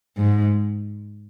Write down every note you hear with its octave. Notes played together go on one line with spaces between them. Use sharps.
G#2